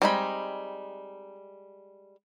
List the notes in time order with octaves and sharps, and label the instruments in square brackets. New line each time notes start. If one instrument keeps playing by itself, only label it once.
[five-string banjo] G3 G#3 B5 [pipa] C4 D#4